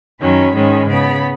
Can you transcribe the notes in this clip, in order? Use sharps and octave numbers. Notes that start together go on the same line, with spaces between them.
F#2 D#3 F#3 C#4 B5
G#2 D#3 G#3 C#4
C#3 B3 B5